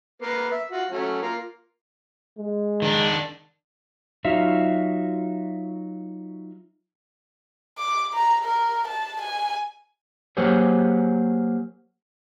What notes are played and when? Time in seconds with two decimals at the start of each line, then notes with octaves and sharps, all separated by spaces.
0.22 A#3 B3
0.52 E5
0.72 F4 F#4
0.91 F#3 A3 C#4
1.22 A#3 F4
2.38 G#3
2.82 D#3 D4
4.25 F#3 D#4 F4 F#4 E5 F5
7.78 D6
8.14 A#5
8.45 A#4
8.88 A5
9.21 G#5
10.37 F#3 A#3 G4 G#4 C5 C#5